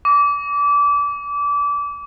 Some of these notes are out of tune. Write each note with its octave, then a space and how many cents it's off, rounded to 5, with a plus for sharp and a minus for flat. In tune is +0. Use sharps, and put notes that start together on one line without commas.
D6 -25